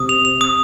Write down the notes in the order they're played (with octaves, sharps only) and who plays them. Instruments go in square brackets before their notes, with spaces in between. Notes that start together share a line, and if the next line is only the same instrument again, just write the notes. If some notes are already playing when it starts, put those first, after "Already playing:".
Already playing: [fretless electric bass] C3 [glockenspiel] D#6
[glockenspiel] F7
F7
D#6